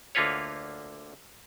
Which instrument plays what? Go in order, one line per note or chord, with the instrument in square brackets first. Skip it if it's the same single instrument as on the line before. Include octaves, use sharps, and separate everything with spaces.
[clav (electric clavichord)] D2 D3 A#3 F4 B4 C#5